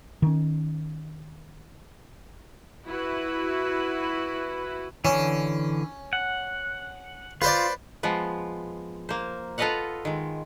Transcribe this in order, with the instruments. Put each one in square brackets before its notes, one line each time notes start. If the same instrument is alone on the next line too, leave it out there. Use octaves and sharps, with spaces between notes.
[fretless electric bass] D#3 C#4
[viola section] E4 F#4 B4
[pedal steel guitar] D3 E3 [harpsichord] C#4
[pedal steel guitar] F#5
[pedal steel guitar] F4 [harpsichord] B4 C5 D5
[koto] F3 G#3 B3 F4
A#3 C5
F4 A4 B4 D#5 F5 F#5
D#3 G#3